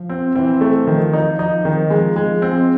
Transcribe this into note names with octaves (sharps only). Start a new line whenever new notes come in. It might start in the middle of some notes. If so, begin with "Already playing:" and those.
Already playing: F3
C4
E3 C4
A3
D#3 F3
D#4
D#4
D#3
F3 G#3
G#3
C4